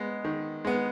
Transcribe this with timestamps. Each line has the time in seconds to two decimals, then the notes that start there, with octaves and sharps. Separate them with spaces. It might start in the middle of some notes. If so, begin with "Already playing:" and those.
Already playing: G#3 B3
0.25 D#3
0.65 G#3 B3